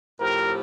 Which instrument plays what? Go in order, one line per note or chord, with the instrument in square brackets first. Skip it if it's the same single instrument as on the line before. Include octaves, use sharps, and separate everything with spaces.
[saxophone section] A2 F3 C4 G4 [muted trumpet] A#4